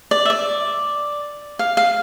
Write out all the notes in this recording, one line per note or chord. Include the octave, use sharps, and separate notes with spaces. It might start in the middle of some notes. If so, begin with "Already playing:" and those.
D5
E5
D5
F5
F5